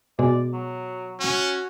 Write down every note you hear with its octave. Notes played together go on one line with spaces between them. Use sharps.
B2 G#3 D5
F#3
C#4 F#4